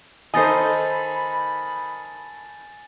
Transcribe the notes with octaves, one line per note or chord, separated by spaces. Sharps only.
D#3 D#4 A4 C5 D#5 G#5 B5 A6